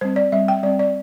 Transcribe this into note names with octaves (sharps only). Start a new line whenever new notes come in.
G3 C4 C5
D5
G3 C4 E5
G5
G3 C4 D5
D5